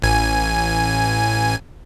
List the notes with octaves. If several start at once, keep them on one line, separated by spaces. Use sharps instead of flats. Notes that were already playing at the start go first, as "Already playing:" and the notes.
A1 G#5